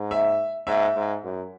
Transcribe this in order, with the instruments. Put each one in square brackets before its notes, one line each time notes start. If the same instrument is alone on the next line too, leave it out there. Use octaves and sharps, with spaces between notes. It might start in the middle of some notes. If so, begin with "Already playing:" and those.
Already playing: [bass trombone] G#2
[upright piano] E5
[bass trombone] G#2 [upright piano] E5
[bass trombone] G#2
F#2